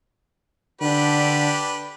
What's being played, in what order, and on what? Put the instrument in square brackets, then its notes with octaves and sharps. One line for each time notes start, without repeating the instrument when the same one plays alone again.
[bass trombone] D3 [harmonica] D4 G4 B4